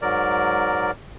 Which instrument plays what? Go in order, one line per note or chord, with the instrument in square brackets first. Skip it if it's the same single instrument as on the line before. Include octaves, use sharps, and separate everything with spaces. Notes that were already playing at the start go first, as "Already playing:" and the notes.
[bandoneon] G#2 F#3 A#4 D5